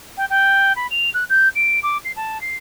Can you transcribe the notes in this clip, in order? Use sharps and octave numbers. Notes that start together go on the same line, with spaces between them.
G5
G5
B5
F7
F#6
G6
D7
D6
C7
A5
C7